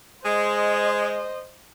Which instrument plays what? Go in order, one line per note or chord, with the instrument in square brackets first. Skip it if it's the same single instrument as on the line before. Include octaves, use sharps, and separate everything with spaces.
[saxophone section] G#3 [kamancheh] C5 D#5